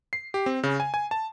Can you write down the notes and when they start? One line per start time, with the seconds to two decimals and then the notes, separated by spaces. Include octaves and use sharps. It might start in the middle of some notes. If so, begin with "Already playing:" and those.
0.13 C7
0.34 G4
0.46 C4
0.63 C#3
0.80 G#5
0.94 G#5
1.11 A5